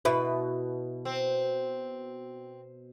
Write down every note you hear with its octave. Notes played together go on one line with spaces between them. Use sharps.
B2 E4 B4
C4